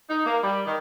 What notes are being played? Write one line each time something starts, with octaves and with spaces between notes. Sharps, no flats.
D#4
A#3
G3
D#3